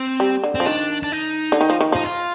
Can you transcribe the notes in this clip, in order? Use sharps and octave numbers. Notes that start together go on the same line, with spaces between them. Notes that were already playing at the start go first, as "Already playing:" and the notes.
Already playing: C4
G3
D3
C4
F3
D#3 D4
D4
D#4
D3
D#3
F3
D#3
F3 D#4
F4